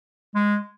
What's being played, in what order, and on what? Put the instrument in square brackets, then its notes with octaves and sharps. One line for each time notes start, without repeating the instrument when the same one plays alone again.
[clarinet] G#3